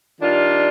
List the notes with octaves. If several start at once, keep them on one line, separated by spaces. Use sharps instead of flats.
D#3 G3 D4 F4